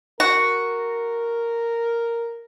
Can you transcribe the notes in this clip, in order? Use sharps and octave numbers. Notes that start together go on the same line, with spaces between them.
F#4 A#4